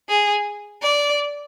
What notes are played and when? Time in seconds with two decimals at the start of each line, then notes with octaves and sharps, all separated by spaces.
0.09 G#4
0.82 D5